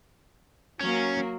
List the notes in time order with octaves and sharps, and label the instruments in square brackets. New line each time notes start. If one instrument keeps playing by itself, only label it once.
[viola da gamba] F#3 A#3 [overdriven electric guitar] C#4